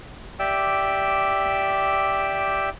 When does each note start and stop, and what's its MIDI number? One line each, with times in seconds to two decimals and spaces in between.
0.39 2.69 67
0.39 2.69 74
0.39 2.69 76
0.39 2.69 79
0.39 2.69 88